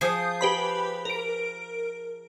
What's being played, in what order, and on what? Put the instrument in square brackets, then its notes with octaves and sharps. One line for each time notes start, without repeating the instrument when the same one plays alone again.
[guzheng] F3 G#4 [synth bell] D#6 G6 C7
[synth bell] G4 B4 B5
A#4 D7